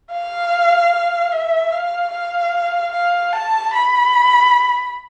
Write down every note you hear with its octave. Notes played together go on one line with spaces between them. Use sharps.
F5
E5
F5
F5
F5
A5
B5